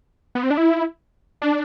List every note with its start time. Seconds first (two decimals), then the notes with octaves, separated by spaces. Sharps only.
0.35 B3
0.43 C4
0.50 D4
0.57 E4
1.42 D4